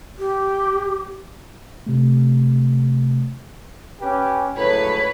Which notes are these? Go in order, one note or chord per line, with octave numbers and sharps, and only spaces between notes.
G4
C3 A3
C#4 G4 B4
C#2 A2 F#3 B4 C#5